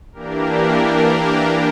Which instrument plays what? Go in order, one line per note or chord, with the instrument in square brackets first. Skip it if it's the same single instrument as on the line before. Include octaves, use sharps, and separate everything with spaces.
[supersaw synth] E3 A#3 D4 G4 A#4